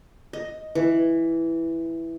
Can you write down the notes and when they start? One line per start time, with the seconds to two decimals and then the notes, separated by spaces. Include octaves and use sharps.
0.33 D#5
0.75 E3